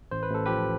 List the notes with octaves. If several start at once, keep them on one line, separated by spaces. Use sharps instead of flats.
A1 C5
B4
A1 A4
F3 G4 B4